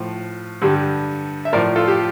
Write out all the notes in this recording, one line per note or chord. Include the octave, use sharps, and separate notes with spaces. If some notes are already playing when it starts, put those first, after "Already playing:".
Already playing: A2 F3
G2 D3 G3
E5
A2 F3 A#4 D5
F4 A4
G4